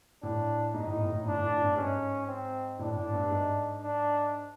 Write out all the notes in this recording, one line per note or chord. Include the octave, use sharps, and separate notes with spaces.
A2 D4
G#2 D#4
A2
A2
A2
A2 D4
A2
A2
G2
G#2 C#4
C4
A2 D4
A2
G2
G#2
D4